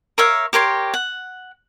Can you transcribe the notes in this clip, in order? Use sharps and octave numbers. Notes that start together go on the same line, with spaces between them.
A#4 C#5 E5 F5
G4 A#4 C#5 C6
F#5